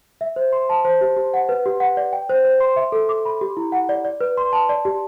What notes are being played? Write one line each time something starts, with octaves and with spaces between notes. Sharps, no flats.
E5
C5
C6
A5
C5
G4
G4
F#5
B4
G4
F#5
D5
G5
C5
C5
C6
E5
A4
D6
B5
G4
E4
F#5
D5
D5
B4
C6
A5
D5
G4